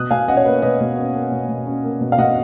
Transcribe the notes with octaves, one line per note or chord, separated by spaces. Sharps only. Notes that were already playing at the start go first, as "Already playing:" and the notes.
Already playing: B2 D#6 F#6
B2 F5 G#5
C#4 D#5 F#5
C#5
A#3 B4
B2 B4 D#5
B2
C#4
A#3
B2
B2
C#4
A#3
B2
F5
B2 D#5 F#5